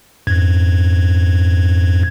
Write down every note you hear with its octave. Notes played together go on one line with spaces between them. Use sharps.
F2 G#2 G#6